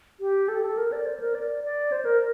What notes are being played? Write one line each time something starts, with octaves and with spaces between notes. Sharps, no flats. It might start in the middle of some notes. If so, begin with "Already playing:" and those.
G4
A4
A4
A#4
D5
C5
A#4
D5
D5
C5
A#4